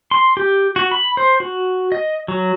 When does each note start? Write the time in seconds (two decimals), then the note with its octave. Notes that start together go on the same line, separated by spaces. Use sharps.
0.11 C6
0.37 G4
0.76 F#4
0.91 B5
1.17 C5
1.40 F#4
1.92 D#5
2.28 F#3